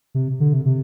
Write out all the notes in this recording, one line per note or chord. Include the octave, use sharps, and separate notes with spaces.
C3
D3
C3
C3